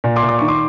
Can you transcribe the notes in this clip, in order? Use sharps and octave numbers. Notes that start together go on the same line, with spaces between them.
A#2
C6 D6
A#2
D6
D#3 C#6
C6 D6